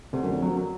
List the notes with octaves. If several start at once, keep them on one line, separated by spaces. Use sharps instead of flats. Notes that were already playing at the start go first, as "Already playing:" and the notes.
D2 C3
F#2
F2 D3
F2 F#3
F#2
F#3